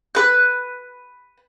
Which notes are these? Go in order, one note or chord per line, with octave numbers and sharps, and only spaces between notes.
B4 F#6